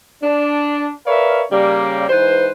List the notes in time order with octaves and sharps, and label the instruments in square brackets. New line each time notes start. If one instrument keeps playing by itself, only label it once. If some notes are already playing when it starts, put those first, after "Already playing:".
[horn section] D4
A#4 B4 C#5 D5 E5 F5
C#3 G3 A#3
G#2 E3 B4 C5